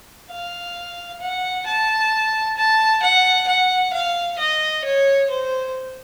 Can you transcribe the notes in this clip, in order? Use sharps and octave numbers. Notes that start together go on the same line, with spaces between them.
F5
F#5
A5
A5
F#5
F#5
F5
D#5
C#5
C5